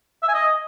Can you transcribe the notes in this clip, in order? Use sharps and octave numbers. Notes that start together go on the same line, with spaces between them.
E5
G#5
D#5